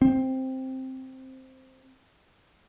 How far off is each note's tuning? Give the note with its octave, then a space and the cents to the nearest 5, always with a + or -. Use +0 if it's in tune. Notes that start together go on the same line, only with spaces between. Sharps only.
C4 +5